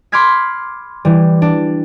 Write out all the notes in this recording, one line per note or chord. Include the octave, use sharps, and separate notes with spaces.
B5 C6 D6 F6 G#6 B6
E3 G3
D4